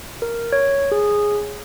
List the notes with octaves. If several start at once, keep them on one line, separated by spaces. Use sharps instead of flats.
A#4
C#5
G#4